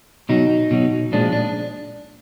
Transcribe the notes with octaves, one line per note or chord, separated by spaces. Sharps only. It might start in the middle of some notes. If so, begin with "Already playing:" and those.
B2 F#3 D#4
B2 F#3
A#2 F3 G#3 D4
D4